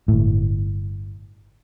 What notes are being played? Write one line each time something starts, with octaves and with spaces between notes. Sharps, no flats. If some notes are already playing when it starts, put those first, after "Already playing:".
G1 A2